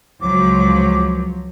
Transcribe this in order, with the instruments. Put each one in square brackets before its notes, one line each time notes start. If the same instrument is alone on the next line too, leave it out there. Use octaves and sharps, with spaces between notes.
[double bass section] C#2 [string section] F3 F#3 [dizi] D6